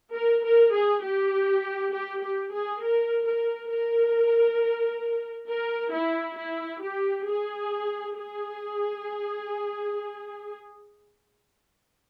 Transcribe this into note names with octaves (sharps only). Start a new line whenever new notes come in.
A#4
A#4
G#4
G4
G4
G4
G#4
A#4
A#4
A#4
A#4
E4
E4
G4
G#4
G#4